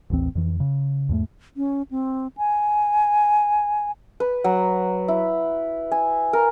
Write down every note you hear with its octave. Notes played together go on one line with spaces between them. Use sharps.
A1 D#2 E3 C4
F2 E3
C#3
E2 G#2 G3 A3
C#4
C4
G#5
B4
F#3
E4
G#5
A#4